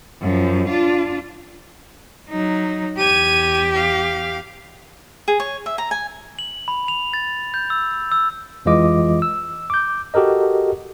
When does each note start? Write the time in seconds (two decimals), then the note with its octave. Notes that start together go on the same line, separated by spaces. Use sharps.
0.21 F#2 F3
0.68 D4 F4
2.30 F#3 D#4
2.98 E2 G4 G#6 D#7
3.75 F5
5.28 G#4
5.40 C#5
5.66 E5
5.78 A#5
5.91 G#5
6.39 F#7
6.68 B5
6.88 F7
7.13 A6
7.54 G6
7.70 E6
8.12 E6
8.65 F2 E3 G#3 F4 D#5 D6
9.22 E6
9.70 D6 G6
10.14 F#4 G4 A4 A#4 D#5